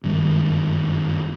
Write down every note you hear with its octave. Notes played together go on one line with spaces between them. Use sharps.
F#1 G2 D#3 G#3